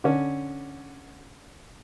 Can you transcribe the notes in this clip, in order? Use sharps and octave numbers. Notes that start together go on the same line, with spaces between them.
D3 C#4